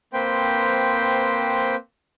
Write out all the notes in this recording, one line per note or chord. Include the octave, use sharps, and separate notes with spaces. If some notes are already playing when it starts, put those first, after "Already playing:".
A#3 C4 B4 C5 G5